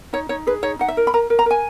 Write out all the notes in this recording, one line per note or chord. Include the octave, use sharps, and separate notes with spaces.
D#4 C#5
D#4 C#5
G#4 B4
D#4 C#5
D#4 F#5
E5
A#4
B5
A#4 A#5
A#4
A#5
A#4 G#5